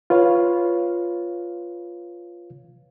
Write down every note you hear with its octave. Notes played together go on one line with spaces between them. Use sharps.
F4 B4 C#5 F5